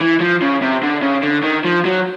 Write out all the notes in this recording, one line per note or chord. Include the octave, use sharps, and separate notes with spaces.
E3
F3
C#3
C3
D3
C#3
D3
D#3
F3
F#3